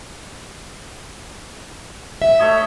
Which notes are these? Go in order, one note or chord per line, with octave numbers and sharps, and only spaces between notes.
E5
A3 C#5 D#5